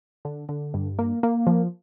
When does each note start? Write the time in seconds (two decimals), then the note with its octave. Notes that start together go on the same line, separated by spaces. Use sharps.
0.25 D3
0.49 D3
0.74 G2
0.99 A#3
1.23 A#3
1.47 F3